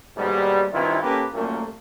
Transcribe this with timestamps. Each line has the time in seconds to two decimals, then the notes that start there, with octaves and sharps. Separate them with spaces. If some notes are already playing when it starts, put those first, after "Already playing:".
0.17 D#2 G#2 B2 G3
0.73 G2 D#3 E3 C4 E4 F4
1.03 A#3 C#4 G4 A4 B4
1.33 C2 F#2 A#2 A3 A#3